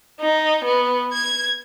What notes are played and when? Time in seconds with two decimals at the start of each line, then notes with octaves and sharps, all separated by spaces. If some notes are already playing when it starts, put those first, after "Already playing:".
0.21 D#4
0.65 B3
1.14 G#6